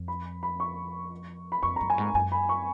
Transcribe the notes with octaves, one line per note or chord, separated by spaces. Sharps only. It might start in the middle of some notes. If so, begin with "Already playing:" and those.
Already playing: F2
B5
B5
C#6
B5
F2 C#6
F#2 A#5
G#5
G#2 A#5
F#2 G#5
B5
C#6